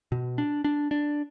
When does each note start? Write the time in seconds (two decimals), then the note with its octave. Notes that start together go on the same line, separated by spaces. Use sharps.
0.12 B2
0.38 D4
0.64 D4
0.91 D4